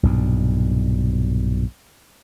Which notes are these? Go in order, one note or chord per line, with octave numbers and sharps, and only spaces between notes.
B1 G2 A#2